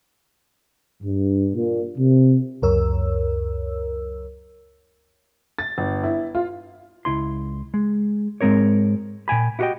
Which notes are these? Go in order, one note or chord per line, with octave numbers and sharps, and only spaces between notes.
G2
A#2
C3
C#2 F#2 A#4 C#5 E6
A6
G1
E4
F4
C#2 E4 C6
G#3
G#2 G#3 C4 A#4 C#5
A#2 G5 G#5 B5
E4 F#4 G4 A#4 D#5 G5